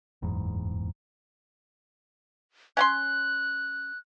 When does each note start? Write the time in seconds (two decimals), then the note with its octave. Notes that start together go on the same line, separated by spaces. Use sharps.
0.22 F#1 E2 G#2
2.77 C#4 F#5 C6 F#6